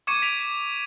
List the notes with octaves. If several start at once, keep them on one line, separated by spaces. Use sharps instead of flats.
C#6 D6 G#6 C#7 D#7 E7
C#6 D6 B6 D7 F7
B6